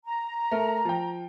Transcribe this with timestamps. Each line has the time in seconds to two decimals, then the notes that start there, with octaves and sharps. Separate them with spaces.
0.05 A#5
0.51 A3 A#4
0.85 F3 G5